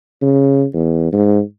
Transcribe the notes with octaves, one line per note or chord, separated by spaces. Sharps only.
C#3
E2
G#2